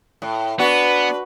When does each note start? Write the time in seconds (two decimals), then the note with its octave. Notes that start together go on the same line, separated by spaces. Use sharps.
0.22 A2
0.59 B3 D4 F#4 B4